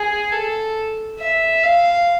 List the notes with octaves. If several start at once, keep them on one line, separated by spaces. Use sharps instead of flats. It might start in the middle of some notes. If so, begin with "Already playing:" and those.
Already playing: G#4
A4
E5
F5